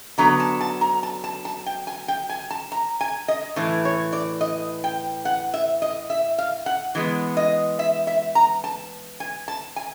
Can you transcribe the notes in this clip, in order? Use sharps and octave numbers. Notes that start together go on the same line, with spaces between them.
D3 F#3 B3 A#5
A5
A5
A#5
A5
A5
A5
G5
G#5
G5
G#5
A5
A#5
G#5
D#5
A2 E3
C#5
D5
D#5
G5
F#5
E5
D#5
E5
F5
F#5
E3 G#3 B3
D#5
E5
E5
A#5
A5
G#5
A5
G#5